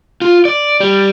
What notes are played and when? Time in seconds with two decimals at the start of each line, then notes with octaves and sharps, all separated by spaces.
0.22 F4
0.45 D5
0.80 G3